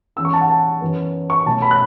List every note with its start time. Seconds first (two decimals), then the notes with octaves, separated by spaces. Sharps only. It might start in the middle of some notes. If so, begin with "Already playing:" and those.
0.16 E2 E3 C#4 E6
0.25 C#6
0.33 A5
0.41 F#5
0.50 A5
0.81 F#2 E3 B3
1.30 C#6
1.46 B2 F#3 A3 A5
1.62 B5
1.71 F#6